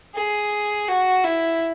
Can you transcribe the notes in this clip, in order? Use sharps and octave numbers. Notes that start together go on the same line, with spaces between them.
G#4
F#4
E4